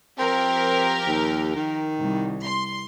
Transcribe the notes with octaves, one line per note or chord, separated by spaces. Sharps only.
F3 C4 G4 A#4
D#2
D#3
C2
C6